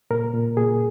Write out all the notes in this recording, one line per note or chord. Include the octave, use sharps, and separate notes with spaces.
A#2 A#4
A#2
A#2 G#4